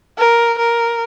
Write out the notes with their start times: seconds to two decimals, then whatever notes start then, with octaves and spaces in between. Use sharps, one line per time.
0.18 A#4
0.58 A#4